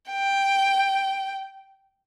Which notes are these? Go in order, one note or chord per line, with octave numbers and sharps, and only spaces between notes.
G5